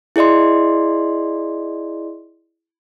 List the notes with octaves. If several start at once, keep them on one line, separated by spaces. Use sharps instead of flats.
E4 G#4 D5 D#5 C6